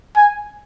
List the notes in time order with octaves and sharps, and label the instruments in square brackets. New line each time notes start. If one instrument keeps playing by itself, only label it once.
[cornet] G#5